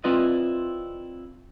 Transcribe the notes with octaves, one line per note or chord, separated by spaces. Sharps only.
C4 E4 F4 B4 D5 D#5